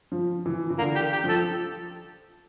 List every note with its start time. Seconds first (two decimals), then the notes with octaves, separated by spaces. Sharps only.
0.12 F3
0.46 E3
0.70 E3
0.78 D3 A#3
0.95 G4
1.12 G4
1.24 F3
1.29 A4